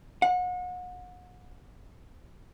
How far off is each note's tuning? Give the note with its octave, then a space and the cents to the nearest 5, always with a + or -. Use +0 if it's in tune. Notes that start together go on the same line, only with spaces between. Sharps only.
F#5 -35